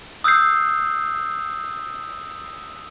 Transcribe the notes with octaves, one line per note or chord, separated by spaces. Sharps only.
D#6 E6 F#6 G6 C7